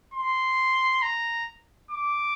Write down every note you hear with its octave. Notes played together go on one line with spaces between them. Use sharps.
C6
A#5
D6